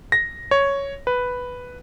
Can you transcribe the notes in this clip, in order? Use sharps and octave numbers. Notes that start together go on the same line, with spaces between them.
A#6
C#5
B4